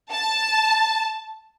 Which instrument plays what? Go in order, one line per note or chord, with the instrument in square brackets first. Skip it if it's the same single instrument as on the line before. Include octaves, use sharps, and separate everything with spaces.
[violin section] A5